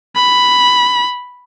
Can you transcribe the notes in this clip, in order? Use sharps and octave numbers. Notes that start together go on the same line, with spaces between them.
B5